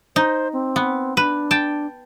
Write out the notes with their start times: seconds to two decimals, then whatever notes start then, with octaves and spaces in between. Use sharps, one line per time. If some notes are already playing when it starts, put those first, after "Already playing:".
0.16 D#4 C5
0.53 C4
0.76 B3
1.17 D4 B4
1.51 G5 A5